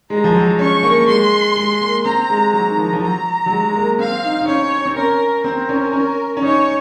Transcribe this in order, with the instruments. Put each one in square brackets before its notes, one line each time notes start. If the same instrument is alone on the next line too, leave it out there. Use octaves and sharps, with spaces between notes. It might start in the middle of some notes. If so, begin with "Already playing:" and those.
[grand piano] G#3 [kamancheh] A#5
[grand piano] F3
F#3
[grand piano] C#4 [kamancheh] C#6
[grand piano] A#3
[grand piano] G#3 [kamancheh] C6
[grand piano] G#3
A#3
[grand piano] C4 [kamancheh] A#5
[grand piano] G#3
[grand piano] F#3 [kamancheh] A#5
[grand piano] D#3
F3
F3
[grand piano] F#3 [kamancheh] A#5
[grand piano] F#3
G#3
G#3
A#3
[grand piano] C4 [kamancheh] F5
[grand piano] D#4
D#4
[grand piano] C#4 [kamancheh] C#5
[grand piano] C4
[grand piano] C#4 [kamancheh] A#4
[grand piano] C4 [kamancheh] A#4
[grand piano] C#4
C#4
C#4
[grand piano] D#4 [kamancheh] C#5